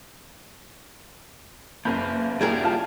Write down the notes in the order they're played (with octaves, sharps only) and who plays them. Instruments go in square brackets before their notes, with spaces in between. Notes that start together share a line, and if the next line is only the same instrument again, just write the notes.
[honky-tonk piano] F#1 G6 [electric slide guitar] A#3 [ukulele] B4 B5
[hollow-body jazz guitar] G3 G#4 A#4 [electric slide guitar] A#3 E4 F#4
[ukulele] F4 F5 A5 [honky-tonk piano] F6